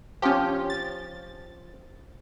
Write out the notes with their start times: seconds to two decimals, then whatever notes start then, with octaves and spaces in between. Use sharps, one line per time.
0.22 F3 C#4 G4
0.70 A6